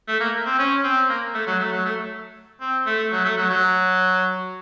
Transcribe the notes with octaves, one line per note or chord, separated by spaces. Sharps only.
A3
A#3
C4
C#4
C4
A#3
A3
F#3
A3
F#3
A3
C4
A3
F#3
A3
F#3
F#3